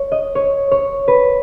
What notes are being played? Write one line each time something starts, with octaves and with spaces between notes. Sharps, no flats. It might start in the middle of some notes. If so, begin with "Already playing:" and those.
Already playing: C#5
D#5
C#5
C#5
B4